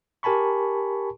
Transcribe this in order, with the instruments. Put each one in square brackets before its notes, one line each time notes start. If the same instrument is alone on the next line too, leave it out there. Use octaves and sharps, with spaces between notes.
[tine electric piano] G4 A#4 G#5 A5 B5 C#6